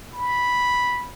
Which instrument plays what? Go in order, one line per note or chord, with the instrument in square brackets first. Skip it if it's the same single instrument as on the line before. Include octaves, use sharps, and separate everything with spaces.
[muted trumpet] B5